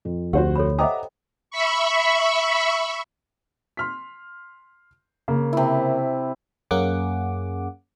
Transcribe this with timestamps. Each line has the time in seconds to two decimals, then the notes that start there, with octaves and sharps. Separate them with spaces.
0.05 F2
0.33 D2 F#4 G4 C5 F#5
0.56 A4 C#5 B5
0.79 C5 D#5 E5 F#5 G5 A#5 D6 D#6
1.51 E5 B5 C#6
3.77 C6 F6 B6
5.28 C#3 A#3 A#4
5.53 C3 E4
6.71 F#2 A#3 C#4 G#4 F#5 D6